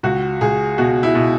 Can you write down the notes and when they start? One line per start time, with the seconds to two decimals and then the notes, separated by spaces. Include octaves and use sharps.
0.03 C#2 F#4
0.41 C#2 G#4
0.78 B2 F#4
1.03 E4
1.15 B2